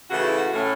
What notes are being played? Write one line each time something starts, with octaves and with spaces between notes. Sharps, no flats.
C#3 E3 A3 F#4
E4
F#4
A2 A3 C#4